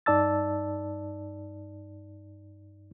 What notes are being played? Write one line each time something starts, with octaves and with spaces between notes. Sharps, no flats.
G2 D#4 D5 A5 E6 A6